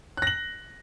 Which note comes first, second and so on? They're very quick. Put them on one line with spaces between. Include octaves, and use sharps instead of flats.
F#6 A#6 F#7